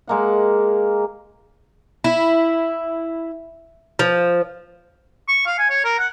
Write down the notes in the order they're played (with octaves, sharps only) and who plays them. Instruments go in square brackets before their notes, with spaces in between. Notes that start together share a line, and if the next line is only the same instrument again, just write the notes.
[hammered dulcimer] G#3 A#3 F#5
[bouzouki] E4
F3
[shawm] C#6
F5
G#5
C#5
A#4
F#5